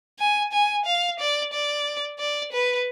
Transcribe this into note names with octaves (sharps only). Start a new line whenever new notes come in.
G#5
G#5
F5
D5
D5
D5
B4